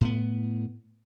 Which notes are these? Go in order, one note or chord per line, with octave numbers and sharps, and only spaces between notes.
A2 B3